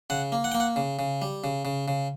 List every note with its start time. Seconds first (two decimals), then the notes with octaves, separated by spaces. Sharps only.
0.10 C#3 F#5
0.32 A#3
0.44 F#5
0.52 A#3 G5
0.60 F#5
0.76 C#3
0.99 C#3
1.22 G3
1.44 C#3
1.65 C#3
1.88 C#3